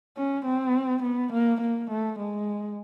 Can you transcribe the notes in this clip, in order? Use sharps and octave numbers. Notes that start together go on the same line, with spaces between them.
C#4
C4
B3
A#3
A#3
A3
G#3